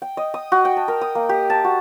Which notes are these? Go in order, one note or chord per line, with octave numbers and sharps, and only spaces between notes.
G5
D#5
D#6
F#4
G5
A5
A#4
D#6
A#3
G4
A5
F#4